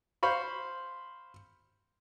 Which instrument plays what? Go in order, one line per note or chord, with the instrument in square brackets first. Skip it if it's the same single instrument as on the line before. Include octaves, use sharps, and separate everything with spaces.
[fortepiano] C5 F5 B5 C#6